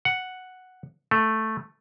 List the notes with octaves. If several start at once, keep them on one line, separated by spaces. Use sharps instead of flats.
F#5
A3